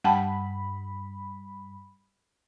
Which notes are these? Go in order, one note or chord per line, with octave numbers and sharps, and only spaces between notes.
G2 F#5 G5 A5 B5